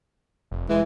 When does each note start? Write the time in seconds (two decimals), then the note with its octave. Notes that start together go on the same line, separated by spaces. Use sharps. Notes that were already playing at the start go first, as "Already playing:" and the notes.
0.51 F1
0.69 E3 G#3